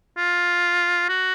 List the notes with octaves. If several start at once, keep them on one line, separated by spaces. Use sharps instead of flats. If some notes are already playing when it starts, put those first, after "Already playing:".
F4
F#4